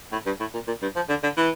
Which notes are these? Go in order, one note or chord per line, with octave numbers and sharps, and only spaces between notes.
A2
G2
A2
A#2
A#2
G2
F3
D3
D3
E3